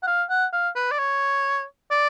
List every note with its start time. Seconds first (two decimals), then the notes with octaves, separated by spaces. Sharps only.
0.03 F#5
0.07 F5
0.30 F#5
0.53 F5
0.76 B4
0.91 D5
0.99 C#5
1.91 D5